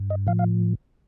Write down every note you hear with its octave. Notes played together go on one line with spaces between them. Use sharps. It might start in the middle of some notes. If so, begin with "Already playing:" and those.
Already playing: G2
D#5
A2 F3 F5
F5